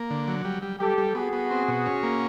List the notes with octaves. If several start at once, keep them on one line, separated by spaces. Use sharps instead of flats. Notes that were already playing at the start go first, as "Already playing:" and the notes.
Already playing: A#3
D3
F#3
G3
G3
G3 G4 A4
G3
B3 F#4 G#4
B3
C4
B2
C#4
A#3